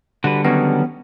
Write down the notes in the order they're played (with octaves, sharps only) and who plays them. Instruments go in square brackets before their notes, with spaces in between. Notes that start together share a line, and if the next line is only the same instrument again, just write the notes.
[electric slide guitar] D3 G3 [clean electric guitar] F#4 B4
[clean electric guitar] D#3 F#3 C#4 [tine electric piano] B3